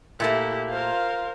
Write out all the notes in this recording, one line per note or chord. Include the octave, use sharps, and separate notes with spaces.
A#2 A3 A#3 E4 G4
F4 A#4 C5 F5